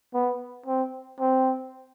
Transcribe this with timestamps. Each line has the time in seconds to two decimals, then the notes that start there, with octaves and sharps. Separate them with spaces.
0.14 B3
0.66 C4
1.20 C4